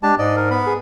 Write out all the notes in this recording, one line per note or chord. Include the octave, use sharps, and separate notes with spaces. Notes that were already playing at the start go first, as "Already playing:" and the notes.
G#3 D4 G4 A5
G#2 D5 D#5
A#4
B3 B5
G#4